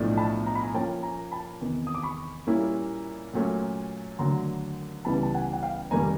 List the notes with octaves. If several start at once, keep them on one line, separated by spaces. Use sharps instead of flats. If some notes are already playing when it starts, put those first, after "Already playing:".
Already playing: B1 A2 F3 A3 D4
A5 B5
A#5
B5
G#5 A#5
A#2 F3 A#3 C#4 F4 G5 A5
G#5 A#5
A5 B5
E2 C3 D#3
D#6
D6
B5 C#6
A#2 G3 A#3 C#4 E4
A#2 F#3 A3 C#4
D#2 D3 F#3 A3 A#5 C6
C#2 C#3 E3 G3 B3 A5 B5
A5
F#5 G#5
F#5
F5 G5
F1 D#3 G3 A#3 G#5 A#5